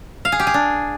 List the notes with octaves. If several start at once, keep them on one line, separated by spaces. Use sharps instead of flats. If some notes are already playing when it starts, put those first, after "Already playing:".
F5
G#4
G4
G#4
D4